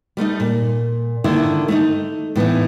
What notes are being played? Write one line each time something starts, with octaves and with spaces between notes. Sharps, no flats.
G3 A3 B3 D#4
A#2
D3 D#3 A#3 E4
A3 B3 D#4
A2 E3 B3 D#4